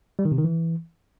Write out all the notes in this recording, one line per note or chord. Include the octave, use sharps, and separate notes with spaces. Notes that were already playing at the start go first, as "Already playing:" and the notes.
G3
D#3
C3
D#3
E3